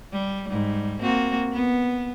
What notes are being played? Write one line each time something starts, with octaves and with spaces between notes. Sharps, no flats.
G3
G#2 G3
A#3 C4 F#4
B3